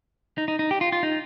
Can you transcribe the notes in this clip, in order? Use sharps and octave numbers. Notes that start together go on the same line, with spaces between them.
D#4
D#4
D#4
G4
F4
F4
D#4